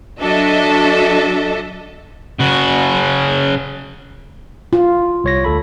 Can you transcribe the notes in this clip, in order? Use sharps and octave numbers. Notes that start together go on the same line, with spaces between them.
F#3 D4 F#4 A4 D#5 E5
C#3 F#4
F4
C2 C#5 A#6
D2 A4 B5